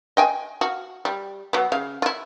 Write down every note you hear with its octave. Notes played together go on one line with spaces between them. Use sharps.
D#5 G5 G#5
F#4 F5
G3
F#3 B3
C#3 F5
E4 F4